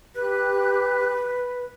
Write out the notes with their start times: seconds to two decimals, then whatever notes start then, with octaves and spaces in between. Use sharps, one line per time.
0.15 G4 B4 F#6